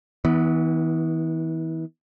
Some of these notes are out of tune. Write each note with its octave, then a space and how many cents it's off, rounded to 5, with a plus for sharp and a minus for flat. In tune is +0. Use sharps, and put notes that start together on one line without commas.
E3 -35 B3 +0